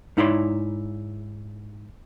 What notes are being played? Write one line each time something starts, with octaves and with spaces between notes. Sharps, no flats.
G#2 D#4 E4 C#5 D5 C6